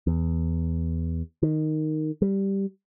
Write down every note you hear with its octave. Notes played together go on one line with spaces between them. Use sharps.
E2
D#3
G3